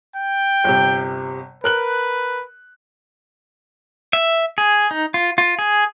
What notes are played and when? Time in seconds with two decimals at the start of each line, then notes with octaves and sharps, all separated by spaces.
0.16 G5
0.64 G1 C3
1.64 A#4 B4 F#6 F#7
4.13 E5
4.58 G#4
4.91 D#4
5.14 F4
5.38 F4
5.59 G#4